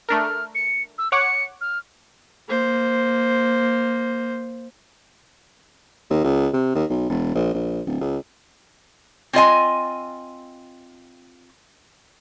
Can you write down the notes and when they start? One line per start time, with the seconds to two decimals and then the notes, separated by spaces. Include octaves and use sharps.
0.09 A3 D4 A#4 F6
0.55 C#7
0.98 E6
1.12 C#5 F#5 D6 C#7
1.61 F6
2.48 A#3 C5
6.10 D#2
6.24 C#2
6.54 C3
6.75 D#2
6.90 B1
7.09 E1
7.35 A#1
7.54 A#1
7.87 D1
8.01 C#2
9.33 C4 F4 D#5 G#5